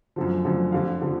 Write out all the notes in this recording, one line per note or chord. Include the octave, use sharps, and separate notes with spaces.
F#2 D3 F3
F#2 D3 F3
F2 D3 F3 F5
D3 F3